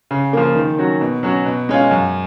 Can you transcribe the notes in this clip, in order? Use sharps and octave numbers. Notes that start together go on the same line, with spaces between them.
C#3
F3 A#3
D#3
F#3 C#4 F#4
B2
F#3 C#4 F#4
B2
G#3 C#4 F4
F#2